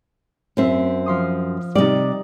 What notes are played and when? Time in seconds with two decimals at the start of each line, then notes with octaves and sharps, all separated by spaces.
0.57 F#2 C4 E5
1.06 F3 C6 D#6
1.75 C3 G3 D#4 D5